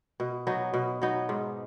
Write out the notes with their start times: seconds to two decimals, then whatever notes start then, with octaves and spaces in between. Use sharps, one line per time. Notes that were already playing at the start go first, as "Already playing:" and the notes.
0.20 B2
0.47 F#3 B3 D#4
0.74 B2
1.02 F#3 B3 D#4
1.29 G#2